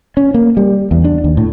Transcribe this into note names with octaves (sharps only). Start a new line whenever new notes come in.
C#4
A#3
G3
E2
D4
D#2
A2